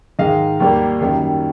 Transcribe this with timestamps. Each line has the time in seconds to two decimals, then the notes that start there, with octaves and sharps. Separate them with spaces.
0.19 G#2 D#3 G#3 D#5 F5
0.60 D#2 D#3 G3 A#3
1.00 F#2 D#3 G3